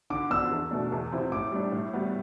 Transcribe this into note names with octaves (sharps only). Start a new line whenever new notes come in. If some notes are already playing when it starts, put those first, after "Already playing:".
D3 D6
F3 B3 D4 E6
E2
B2 A3 D4
E2
C3 F3 C4 E4
A2 D6
G3 D4
A2
G3 B3